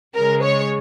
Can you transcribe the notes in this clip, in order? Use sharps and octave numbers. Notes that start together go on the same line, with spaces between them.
C#3 G#3 A#4
C#5